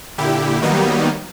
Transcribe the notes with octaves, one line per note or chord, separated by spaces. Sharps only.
A#2 D3 E4 G4
D#3 F#3 G3 A#3 B3 D#4